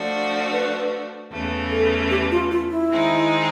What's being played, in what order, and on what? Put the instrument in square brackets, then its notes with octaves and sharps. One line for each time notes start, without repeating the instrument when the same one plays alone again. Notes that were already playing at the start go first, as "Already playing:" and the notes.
Already playing: [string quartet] F3 A3 D4 F#4
[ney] B4
[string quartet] E2 C#3 E3 A3
[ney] A4
G4
F4
F4
E4
[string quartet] D#3 G#3 C4 D#4